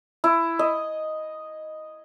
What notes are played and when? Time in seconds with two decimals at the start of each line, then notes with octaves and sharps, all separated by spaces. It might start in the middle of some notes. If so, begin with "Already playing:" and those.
0.24 E4
0.59 D#5